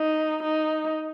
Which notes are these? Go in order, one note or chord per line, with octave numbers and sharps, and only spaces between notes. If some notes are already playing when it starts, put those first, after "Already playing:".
Already playing: D#4
D#4